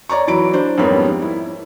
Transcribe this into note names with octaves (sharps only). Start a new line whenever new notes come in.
C#5 D5 A#5 C#6
E3 F#3 B5 D7
D4 C5
F2 G#2 G3 A#3 B3 C#4
E4